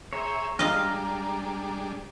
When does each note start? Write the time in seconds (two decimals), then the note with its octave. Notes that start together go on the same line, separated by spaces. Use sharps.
0.13 G#4 C5 C#5 E5 A#5
0.59 G3 G#3 D4 F4 D#5 F6